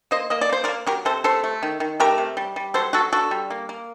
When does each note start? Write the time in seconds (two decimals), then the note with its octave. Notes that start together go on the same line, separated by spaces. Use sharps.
0.11 A#3 C5 D#5
0.30 A#3 D#5
0.41 D5
0.49 A#3 C5
0.64 A#4 D5
0.68 A#3
0.86 F#3 G4 A#4
1.05 C3 A4 C5
1.24 A3 A4 C5
1.44 A3
1.63 D#3
1.80 D#3
2.00 A3 G4 A#4
2.18 C3
2.37 G3
2.56 G3
2.74 F#3 A4 C5
2.93 F#3 F#4 A4
3.12 D3 F#4 A4
3.31 G3
3.50 A#3
3.69 A#3